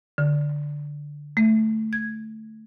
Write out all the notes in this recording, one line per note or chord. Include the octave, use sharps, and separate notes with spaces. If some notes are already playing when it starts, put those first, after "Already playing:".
D3
A3
G#6